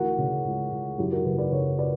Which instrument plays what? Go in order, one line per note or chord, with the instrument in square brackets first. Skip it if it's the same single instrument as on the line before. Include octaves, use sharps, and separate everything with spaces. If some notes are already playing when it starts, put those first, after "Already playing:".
Already playing: [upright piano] D2 E3 F#4 A#4
C#3
C#2
C#2
F#2 E4 G4
F#4 A#4
F#1 G4 B4
B4 D5
F#1 A#4 C#5
B4 D5